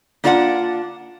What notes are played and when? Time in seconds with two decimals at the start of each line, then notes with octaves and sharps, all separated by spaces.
0.24 A#3 D4 F4 D5 F5 F#5